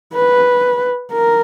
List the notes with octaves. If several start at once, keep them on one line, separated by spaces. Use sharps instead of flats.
B4
A#4